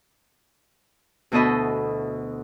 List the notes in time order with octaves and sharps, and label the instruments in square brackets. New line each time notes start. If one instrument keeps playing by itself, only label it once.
[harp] D2 B2 E4 A4 D#5 B5